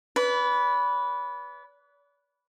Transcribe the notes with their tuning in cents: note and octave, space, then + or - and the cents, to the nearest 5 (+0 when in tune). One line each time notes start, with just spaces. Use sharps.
B4 -5 D5 -40